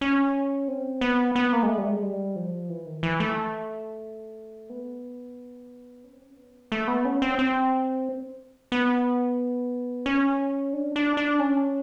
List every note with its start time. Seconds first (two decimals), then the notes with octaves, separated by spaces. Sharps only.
0.01 C#4
0.68 C4
1.01 B3
1.36 B3
1.53 A#3
1.63 G#3
1.68 A3
1.78 G3
1.86 G#3
2.03 G3
2.36 F3
2.69 E3
2.86 D#3
3.03 E3
3.20 A3
4.70 B3
6.04 C#4
6.13 C4
6.21 C#4
6.37 B3
6.72 A3
6.88 B3
7.05 C#4
7.22 C4
7.39 C4
8.72 B3
10.06 C#4
10.73 D4
10.96 D4
11.17 D4
11.39 C#4